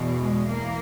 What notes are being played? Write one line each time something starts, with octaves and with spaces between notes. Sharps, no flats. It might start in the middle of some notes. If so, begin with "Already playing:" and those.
Already playing: E2 B2
G#3
E3 A#3